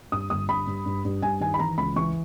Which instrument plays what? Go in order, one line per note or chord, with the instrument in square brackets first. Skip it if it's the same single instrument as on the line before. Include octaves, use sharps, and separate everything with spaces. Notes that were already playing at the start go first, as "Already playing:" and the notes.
[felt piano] G2 D#6
G1 D#6
G2 B5
G2
G2
G2
G2 G#5
D#3 G#5
B5
E3 A#5
C#2 B5
E3 C#6